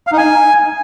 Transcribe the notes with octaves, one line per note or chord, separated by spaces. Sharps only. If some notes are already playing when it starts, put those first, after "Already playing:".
F5
D#4
G#5